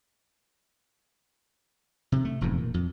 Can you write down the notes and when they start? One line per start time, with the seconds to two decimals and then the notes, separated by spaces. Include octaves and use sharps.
2.12 C3
2.25 A3
2.41 E1 F2 G#2
2.58 A#2
2.74 F2